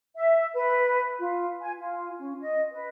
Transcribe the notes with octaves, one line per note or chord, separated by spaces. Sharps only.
E5
B4
F4
G#5
F4
C#4
D#5
B4